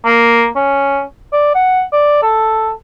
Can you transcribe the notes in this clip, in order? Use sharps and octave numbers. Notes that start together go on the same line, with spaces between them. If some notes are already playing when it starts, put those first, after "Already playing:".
A#3
C#4
D5
F#5
D5
A4